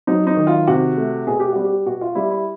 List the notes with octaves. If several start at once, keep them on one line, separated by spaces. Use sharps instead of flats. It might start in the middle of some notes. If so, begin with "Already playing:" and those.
F#3 D#4
D#4
D#3
F4
C3 F#4
A3
B2 G#4
G4
G3 F#4
G4
B2 F#4
F4
G3 E4
E4